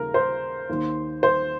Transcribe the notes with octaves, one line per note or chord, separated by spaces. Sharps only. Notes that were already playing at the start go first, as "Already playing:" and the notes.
Already playing: D#2 C#3 F3 A#4
C5
D#2 D#3
C5